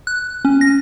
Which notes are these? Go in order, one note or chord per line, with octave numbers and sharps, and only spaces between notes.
F#6
C#4
A#6